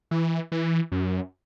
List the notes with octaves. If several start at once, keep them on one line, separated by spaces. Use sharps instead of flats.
E3
E3
F#2